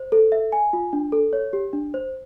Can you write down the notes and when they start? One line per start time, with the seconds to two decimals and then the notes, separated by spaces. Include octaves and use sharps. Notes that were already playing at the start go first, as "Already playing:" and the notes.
Already playing: C5
0.12 A4
0.32 E5
0.52 G#5
0.73 F4
0.93 D4
1.12 A4
1.33 C#5
1.53 G4
1.73 D4
1.94 C5